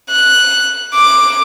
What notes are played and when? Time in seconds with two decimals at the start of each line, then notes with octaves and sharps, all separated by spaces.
0.11 F#6
0.95 D6